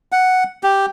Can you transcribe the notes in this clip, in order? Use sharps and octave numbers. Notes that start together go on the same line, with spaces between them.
F#5
G4